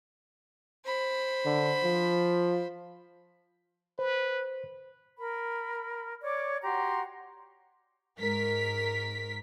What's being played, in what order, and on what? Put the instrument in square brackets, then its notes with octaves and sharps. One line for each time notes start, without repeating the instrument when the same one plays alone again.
[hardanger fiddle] C5 B5
[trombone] D3
F3
[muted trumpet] B4 [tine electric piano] C5
[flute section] A#4 B5
C#5 D5 D6
F#4 G4 A#5 C6
[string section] G#2 A#4 B6